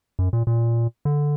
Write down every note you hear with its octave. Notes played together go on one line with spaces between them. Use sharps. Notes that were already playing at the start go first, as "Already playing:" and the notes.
F#2
A#2
A#2
D3